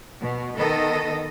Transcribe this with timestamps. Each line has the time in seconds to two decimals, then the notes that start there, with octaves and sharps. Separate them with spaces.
0.19 B2
0.57 D#3 B3 A4 D#5